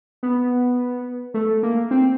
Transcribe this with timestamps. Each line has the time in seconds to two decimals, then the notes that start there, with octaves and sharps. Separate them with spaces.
0.23 B3
1.34 A3
1.63 A#3
1.91 C4